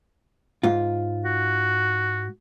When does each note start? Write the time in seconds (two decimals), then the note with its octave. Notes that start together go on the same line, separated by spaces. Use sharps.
0.63 G#2 F4
1.25 F#4